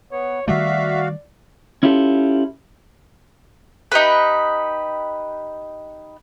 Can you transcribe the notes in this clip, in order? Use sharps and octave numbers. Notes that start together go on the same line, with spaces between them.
B3 C#5
D#3 G3 A3 F#4 D5 E5 F5
C#4 E4 F4 G4 A4
D#4 G4 B4